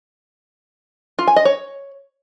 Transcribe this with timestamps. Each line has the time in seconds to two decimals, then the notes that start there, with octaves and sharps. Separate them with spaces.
1.19 F4
1.27 G#5
1.36 D#5
1.45 C#5